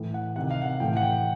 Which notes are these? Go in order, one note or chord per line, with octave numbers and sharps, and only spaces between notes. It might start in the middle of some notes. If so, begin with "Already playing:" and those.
Already playing: A2 E3
F#5
C3 D#3 F#5
F5
F#5
F5
A2 E3 G5
F#5
G5